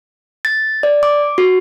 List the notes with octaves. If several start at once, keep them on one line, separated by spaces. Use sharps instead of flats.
A6
D5
D6
F#4